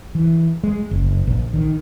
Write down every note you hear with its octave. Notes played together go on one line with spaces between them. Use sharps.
E3
G#3
F#1
A#1
D#3